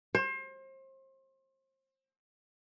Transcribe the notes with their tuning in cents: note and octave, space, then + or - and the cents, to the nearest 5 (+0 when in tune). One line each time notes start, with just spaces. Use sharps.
C5 +35